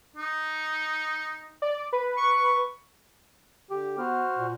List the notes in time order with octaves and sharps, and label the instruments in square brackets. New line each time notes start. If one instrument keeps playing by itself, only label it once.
[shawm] D#4
[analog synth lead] D5
B4
[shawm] C#6
[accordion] D3 [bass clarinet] G4
[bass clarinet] B3 [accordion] F#4 C5 F6
[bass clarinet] A#2